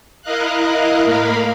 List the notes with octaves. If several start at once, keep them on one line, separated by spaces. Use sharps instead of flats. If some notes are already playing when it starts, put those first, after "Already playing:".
E4 A#4 D#5 F5 F#6
A2 A#3 A#4 F5 B5